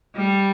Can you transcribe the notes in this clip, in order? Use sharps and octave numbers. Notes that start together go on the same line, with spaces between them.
G3